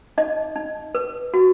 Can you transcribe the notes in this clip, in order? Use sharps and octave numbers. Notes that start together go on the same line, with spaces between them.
D#4 D#5
D#4
B4
F#4